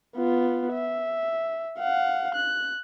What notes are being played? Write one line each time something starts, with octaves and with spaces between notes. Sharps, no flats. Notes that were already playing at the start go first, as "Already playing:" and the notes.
B3 F4
E5
F5 F#5
F#6